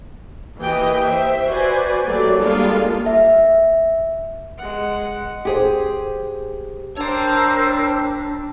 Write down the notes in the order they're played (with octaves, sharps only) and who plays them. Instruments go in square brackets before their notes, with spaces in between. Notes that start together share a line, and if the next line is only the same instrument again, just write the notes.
[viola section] E3 A#3 G4 B4 D#5 G5
C5 E5
F#4 B4 C5 D5 G#5
F#3 A3 A#3 G4 D5
G3 G#3 A#3 D4 F4 A4
[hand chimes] E5
[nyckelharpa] G#3 F#5
[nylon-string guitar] G4 G#4 C5
[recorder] D4 [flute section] A#4 C5 E6 [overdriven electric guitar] C#5 G5 [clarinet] A5